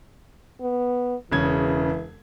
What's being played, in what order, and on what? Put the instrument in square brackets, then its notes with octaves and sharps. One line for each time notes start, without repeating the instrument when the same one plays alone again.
[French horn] B3
[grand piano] E1 C#3 G#6 [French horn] E3